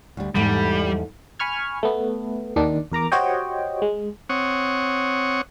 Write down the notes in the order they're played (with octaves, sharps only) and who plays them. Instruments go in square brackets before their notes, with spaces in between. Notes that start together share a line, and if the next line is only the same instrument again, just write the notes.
[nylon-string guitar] D2 G3
[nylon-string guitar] E2 G#2 A3 [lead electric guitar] G3
[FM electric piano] G#5 B5 C#6 F6 G#6
A3 B3
D#2 D#3 D4
E2 A#4 A#5 D6
F#4 G4 C5 C#5 D#5 G5
G#3
[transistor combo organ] C4 C#5 F#5 C#6 D#6